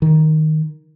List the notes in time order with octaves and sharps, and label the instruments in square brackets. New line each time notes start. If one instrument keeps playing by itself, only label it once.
[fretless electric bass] D#3